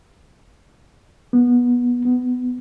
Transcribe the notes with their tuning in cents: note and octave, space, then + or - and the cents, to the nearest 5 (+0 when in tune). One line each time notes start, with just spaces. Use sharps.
B3 -20
B3 +15